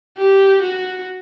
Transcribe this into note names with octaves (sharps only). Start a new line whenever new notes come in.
G4
F#4